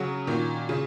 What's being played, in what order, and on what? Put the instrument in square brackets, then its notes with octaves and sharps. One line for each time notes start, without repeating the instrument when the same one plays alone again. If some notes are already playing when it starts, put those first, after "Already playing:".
Already playing: [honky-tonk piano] C#3 F#3 [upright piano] C#4 F#4
[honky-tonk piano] A#2 D#3
C#3